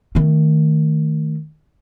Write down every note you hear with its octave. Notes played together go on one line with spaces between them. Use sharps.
D#3 A3